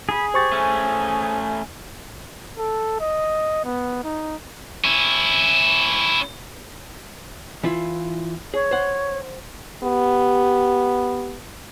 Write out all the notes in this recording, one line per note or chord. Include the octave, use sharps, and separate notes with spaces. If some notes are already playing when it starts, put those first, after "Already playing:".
G#4 B5
G4 C5 C#6 A6
A3 C#4 G#5
A4
D#5
B3
D#4
C#4 E4
E3 E4 F4
G#4 C#5
C5 F#5
B3 G4